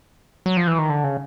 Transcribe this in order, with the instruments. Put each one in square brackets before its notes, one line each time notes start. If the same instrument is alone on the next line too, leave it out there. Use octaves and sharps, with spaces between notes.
[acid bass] F#3
F3
E3
D#3
D3
C#3